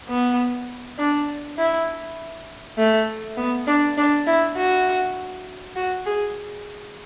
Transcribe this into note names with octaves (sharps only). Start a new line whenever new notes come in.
B3
D4
E4
A3
B3
D4
D4
E4
F#4
F#4
G#4